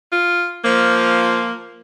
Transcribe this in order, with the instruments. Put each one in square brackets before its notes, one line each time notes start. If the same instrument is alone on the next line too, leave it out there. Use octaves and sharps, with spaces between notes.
[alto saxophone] F4
[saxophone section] F3 [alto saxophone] A#3